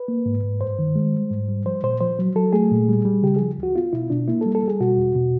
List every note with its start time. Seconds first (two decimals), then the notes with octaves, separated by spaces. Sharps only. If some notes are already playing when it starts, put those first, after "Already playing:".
Already playing: B4
0.08 A#3
0.26 G#2
0.43 G#2
0.61 G2 C5
0.79 D#3
0.96 G#3
1.14 G3
1.31 G#2
1.48 G3
1.65 F3 C5
1.83 A#2 C5
2.01 F3 C5
2.19 F#3
2.36 F#3 A4
2.53 A3 G#4
2.71 A#2
2.88 G3
3.05 G3
3.23 C#3 G4
3.36 F3 G#4
3.58 D2
3.63 F#4
3.76 B3 F4
3.93 B2 E4
4.10 B2 D4
4.28 A#3 E4
4.41 G3 A4
4.55 A4
4.63 G3 G#4
4.80 B2 F#4
4.97 E2
5.15 B2